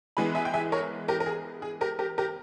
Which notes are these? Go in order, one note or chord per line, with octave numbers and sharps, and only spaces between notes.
E3 G#3 B3 G#5 B5
E5 G#5
G5
E5 G#5
A#4 C#5
G4 A#4
A#4
G#4
G#4
G4 A#4
G4 A#4
G4 A#4